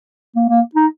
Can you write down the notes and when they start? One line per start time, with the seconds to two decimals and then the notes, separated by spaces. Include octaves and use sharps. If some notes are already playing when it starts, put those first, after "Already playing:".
0.36 A#3
0.49 A#3
0.75 D#4